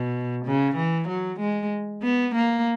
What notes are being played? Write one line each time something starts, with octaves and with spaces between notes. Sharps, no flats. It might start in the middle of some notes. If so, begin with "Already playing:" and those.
Already playing: B2
C#3
E3
F#3
G#3
B3
A#3